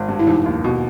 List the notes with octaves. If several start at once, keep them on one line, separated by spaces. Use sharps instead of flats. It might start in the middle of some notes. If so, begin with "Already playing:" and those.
Already playing: G#1
G2
E4
F1 D#4
D#2
B2